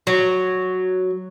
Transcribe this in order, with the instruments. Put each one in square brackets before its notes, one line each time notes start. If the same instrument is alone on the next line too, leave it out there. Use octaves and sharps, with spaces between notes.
[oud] F#3